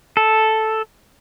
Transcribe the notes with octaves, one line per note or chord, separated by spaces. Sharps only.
A4